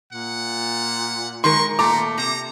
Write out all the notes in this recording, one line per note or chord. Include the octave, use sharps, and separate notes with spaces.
A#2 F#5
D#3 G#3 A#4 C6 C#6
A#2 A3 D#4 A#5 D6
C3 A#5